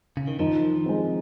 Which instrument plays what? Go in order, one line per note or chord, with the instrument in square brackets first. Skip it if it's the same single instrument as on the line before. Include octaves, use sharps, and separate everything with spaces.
[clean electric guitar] C#3
D#3
[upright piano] D#3 [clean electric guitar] F3
[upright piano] G#3 C4